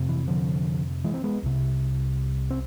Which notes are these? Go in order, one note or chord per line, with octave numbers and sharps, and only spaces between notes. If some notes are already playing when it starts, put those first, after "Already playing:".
Already playing: F2 C3
E3
D3 F3
E3 G#3
C4
G#3 B3
C2 C3
C4